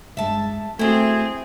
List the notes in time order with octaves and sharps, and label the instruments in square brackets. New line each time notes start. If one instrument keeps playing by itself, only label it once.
[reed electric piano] G2 G#3 [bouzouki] E5 A5
[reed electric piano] A3 F#4 [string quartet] C4 G#4 [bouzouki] E4 G5